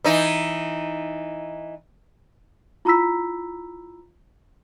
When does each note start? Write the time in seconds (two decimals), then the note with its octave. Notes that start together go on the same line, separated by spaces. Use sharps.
0.04 E3 D#4
2.85 E4 F4 A#5 B5 E6 B6